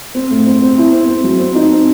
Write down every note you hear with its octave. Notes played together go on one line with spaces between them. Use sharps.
C4
A2
C4
C4
E4
C4
C4
F#3
C4
D#4
C4